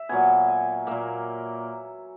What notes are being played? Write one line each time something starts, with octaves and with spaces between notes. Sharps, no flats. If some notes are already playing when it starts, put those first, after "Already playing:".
Already playing: E5
A#2 F#3 B3 G#5
G#5
A#2 A#3 E5